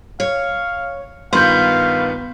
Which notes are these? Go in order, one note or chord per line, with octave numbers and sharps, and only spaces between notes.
C#5 F5
G2 D#3 B3 F4 F5 C6 G6